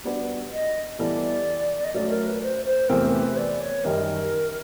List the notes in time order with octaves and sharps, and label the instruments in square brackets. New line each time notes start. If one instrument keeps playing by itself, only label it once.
[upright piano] G3 B3 D4 F#4 B4
[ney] D#5
[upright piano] E3 G3 B3 E4 A4 [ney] D5
[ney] D#5
[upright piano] F#3 A3 C#4 [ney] D5
[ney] A#4
B4
C5
C5
[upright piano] E2 C3 E3 A3 C4 [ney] A#4
[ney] A#4
B4
D5
C#5
[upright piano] F#2 D#3 G3 [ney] A#4